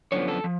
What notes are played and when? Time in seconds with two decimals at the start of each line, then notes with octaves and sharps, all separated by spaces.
0.12 F#2 D3 F3 B3 C#5
0.28 A4
0.44 F3